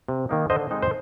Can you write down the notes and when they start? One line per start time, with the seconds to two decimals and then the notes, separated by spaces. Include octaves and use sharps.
0.08 C3
0.29 D#3 A#3 D#4
0.50 D3 C5 D#5
0.71 G#3 C4 D#4
0.82 C5